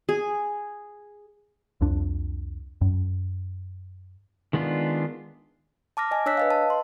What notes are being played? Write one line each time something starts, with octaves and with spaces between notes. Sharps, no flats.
G#4
C2 F2 D4
F#2
D#3 G#3 B3 D4 F4
A5 D6 F6 A#6
D#5 G#5
D4 C#5 E6 F#6 B6
B4 D#5 F5
A5
C6